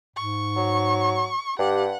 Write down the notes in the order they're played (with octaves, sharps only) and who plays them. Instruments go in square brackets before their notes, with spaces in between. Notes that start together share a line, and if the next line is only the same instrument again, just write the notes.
[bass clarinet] G#2 [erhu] C#6
[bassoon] F#3
[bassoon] G2 [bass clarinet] G4 [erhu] F#5